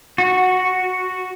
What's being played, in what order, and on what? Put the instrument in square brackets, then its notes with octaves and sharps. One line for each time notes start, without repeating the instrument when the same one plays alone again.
[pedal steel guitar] F#4